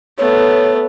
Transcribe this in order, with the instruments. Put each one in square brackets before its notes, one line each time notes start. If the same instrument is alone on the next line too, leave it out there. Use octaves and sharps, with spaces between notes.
[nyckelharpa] A3 B3 [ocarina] C#5